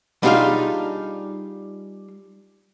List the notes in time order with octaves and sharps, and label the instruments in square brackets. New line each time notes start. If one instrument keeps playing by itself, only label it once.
[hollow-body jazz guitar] G3 D4 D#4 F4 G#4 F5